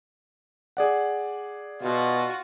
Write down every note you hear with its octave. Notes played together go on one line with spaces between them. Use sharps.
G#4 D5 F#5
B2 F4 F#4